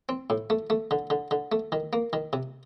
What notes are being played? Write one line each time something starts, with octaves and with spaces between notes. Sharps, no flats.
C4
A2
A3
A3
D3
D3
D3
A3
D#3
A#3
D#3
C3